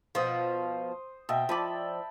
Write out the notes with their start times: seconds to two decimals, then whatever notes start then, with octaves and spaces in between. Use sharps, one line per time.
0.15 B2 F3 C5 D#6
1.29 B2 D#5 E5 G5
1.49 F3 D5 A5 B5